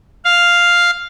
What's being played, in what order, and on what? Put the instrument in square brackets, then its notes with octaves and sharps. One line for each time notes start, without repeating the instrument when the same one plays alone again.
[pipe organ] F5